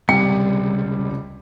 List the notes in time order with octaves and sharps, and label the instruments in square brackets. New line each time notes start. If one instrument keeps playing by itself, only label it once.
[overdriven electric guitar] C#2 C3 [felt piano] G3 [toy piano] G5